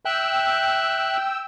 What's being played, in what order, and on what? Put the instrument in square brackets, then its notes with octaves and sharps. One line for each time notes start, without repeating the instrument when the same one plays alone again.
[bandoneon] E5 F#6 [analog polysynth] G5 E6